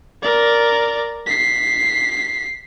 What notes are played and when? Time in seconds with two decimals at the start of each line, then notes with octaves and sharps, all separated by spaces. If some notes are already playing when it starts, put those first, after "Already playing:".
0.23 A#4 D5
1.26 B6 C7